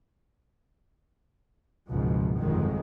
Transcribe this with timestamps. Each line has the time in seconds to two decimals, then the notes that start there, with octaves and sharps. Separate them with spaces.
1.90 F#1 C#2 G#2 B2 F3
2.38 G1 F2 B2 D#3 F#3 G#3